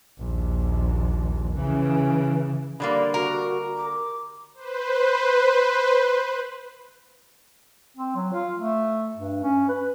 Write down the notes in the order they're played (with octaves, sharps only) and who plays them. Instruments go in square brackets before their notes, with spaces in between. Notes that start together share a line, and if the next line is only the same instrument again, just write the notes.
[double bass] A#1 D#2
C#3 E3
[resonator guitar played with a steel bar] D3 G3 A#3 [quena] B5
[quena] F#4 [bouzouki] A#4
[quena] D6
[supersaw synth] B4 C5
[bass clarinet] C4
F#3
F4
A3
G2
C#4
B4